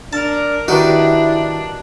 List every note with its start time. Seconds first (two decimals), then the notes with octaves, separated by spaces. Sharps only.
0.13 D4 A#4 A5
0.68 D#3 D4 E4 F#4 G4 B4